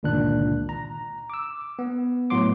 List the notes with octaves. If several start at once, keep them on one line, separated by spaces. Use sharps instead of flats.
G1 C#2 A#2 D#3 D4 F#6
A#5
D6 E6
B3
A2 F#3 B3 C6 D6